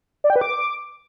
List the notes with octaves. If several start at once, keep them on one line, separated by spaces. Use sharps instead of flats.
D5
G5
B4
D6